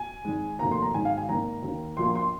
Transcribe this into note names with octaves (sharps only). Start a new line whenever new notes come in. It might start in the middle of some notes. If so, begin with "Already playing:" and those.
Already playing: G#5
G#1 G#2 G#3
F1 D#2 D#3 A#3 A#5
C6
A#5
G#1 G#2 D#3 G#3 G#5
F5
G#5
G#1 G#2 D#3 A#3 A#5
D#2 D#3 A#3
A#1 A#2 A#3 C6
C6